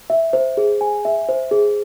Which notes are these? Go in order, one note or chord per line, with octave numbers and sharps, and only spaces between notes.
E5
C5
G#4
G#5
E5
C5
G#4